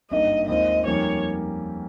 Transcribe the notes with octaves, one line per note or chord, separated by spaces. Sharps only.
G#1 G2 D#3 A#3 D#5
D#2 D#3 G#3 C4 F4 D#5
F2 D#3 G3 A#3 C#4 C#5